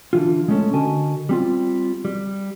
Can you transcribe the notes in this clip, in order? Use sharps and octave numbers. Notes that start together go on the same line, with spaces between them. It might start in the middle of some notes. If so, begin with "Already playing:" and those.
D3 E3 F4
B1 G#3 A3 C#4 A4
D3 F#4 A#4 D#5 G#5 A5
G3 C4 F4
G3